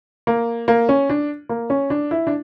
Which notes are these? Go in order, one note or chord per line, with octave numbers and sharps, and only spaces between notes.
A#3
A#3
C#4
D4
A#3
C#4
D4
E4
D4